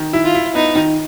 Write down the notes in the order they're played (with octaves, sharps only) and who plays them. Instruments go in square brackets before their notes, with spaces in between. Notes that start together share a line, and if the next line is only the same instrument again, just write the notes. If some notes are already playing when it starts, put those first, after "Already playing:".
Already playing: [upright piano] D#3
E4
[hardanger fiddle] F4
[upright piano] E4
[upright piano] B3 [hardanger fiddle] D#4
[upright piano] D#3